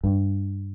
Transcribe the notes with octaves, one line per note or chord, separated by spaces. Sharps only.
G2